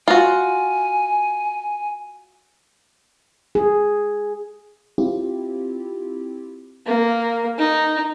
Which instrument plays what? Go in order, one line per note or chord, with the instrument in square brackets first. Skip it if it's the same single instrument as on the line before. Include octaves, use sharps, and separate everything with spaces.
[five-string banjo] F4 F#4 [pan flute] G#5
[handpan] G#4
[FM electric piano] C4 E4 F4 G4
[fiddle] A#3
D#4